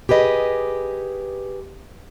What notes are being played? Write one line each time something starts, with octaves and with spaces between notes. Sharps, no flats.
G4 G#4 B4 D#5